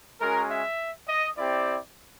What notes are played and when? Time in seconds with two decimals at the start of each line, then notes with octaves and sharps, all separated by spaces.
0.20 G#3 C#4 F#4 A#4
0.49 E5
1.08 D#5
1.37 C4 E4 G4 D5